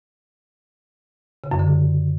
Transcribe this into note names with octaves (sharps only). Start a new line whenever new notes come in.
C#3
F#2
D3